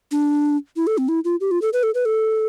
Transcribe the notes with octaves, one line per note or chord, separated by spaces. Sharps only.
D4
E4
A4
C4
E4
F4
G4
F4
A4
B4
A4
B4
A4